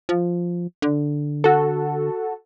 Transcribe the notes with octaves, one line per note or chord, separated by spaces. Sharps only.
F3
D3
F#4 A4